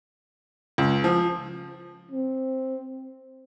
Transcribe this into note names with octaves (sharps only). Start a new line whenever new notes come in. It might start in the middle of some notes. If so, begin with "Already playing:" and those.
C#2
F3
C4